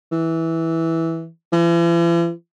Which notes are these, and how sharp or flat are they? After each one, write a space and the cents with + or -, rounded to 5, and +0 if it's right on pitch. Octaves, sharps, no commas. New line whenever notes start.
E3 -10
E3 +45